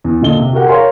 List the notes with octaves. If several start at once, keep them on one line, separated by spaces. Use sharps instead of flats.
E2
A#2 D3 D#5 G7
C3
F#4 G4 A#4 F#5
A#4 C#5 F5 G#5 A#5 C6